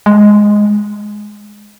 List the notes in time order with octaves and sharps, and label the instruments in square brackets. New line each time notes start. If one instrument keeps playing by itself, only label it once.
[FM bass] G#3